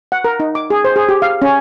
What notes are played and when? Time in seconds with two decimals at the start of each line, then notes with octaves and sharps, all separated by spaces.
0.12 F#5
0.25 A#4
0.40 D#4
0.55 D6
0.70 G#4
0.84 C5
0.96 G#4
1.09 G4
1.22 F5
1.42 C#4